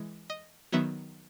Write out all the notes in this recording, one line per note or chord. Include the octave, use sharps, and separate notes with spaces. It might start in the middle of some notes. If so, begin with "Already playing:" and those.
Already playing: E3 G#3
D#5
D#3 F#3 B3 E5